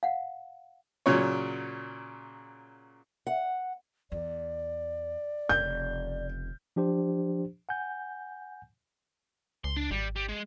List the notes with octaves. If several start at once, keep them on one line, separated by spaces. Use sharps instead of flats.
F5 F#5
A#2 C#3 F#3 C#5
F#5
E2 D5
F1 C#3 G6
F3 D4 G4 C5
F#5 G#5 G6
C#2 C6
D4
G#1 G3
G3
G#3